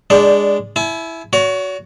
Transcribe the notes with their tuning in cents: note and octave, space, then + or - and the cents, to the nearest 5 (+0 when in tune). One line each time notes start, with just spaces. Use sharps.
G#3 -15 D4 +0 D5 -15
E4 +0 G#5 +45
F#4 +0 C#5 +40